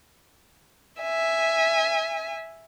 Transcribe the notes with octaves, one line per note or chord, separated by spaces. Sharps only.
E5 G#5